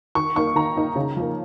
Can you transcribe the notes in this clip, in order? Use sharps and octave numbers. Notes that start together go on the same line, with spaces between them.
D#3 C#6
A#3 D#4 C#6
D#3 A#5
A#3 D#4
C#3
F3 A#3